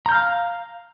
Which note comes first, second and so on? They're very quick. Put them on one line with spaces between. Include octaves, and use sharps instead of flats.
A#5 G6 F6 F5